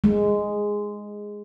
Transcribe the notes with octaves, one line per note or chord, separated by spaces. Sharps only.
G#3